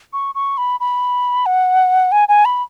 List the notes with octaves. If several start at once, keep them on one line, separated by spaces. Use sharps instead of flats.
C#6
C#6
B5
B5
F#5
G#5
G#5
B5